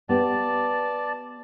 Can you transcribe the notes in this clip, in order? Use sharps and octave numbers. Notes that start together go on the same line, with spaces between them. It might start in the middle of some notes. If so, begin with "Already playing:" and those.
B3 G4 D5 A5